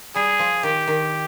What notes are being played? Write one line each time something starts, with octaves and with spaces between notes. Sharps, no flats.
G3 G#4
F3
D#3 G4
D#3